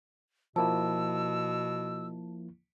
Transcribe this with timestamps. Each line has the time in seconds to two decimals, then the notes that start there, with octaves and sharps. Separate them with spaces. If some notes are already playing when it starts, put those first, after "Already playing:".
0.56 B2 F3 A#3 E4 A5 E6